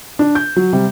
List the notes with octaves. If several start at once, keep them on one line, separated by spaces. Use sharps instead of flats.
D4
G6
F#3
C3 G3